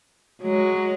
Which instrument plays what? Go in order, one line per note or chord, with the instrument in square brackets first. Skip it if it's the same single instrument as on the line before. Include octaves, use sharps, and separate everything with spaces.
[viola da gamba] F#3 G#3